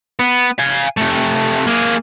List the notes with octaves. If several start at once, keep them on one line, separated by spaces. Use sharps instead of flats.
B3
F5 G#5
C3 A3
A#3 G#4